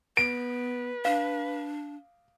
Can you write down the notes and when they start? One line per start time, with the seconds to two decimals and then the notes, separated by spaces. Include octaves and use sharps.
0.17 B3 B4 D7
1.05 D4 F5